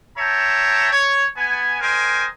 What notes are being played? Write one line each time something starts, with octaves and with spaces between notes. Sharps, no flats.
C#5 E5 G5 A5 A#5
C#5
B3 G#5
A#4 C5 D#5 G5 G#5